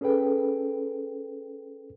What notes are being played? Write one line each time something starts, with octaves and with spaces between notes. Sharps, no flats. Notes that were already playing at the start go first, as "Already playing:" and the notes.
C#4 G#4 A4 B4 G5